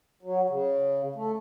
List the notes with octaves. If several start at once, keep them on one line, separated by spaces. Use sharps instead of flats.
F#3
C#3
A3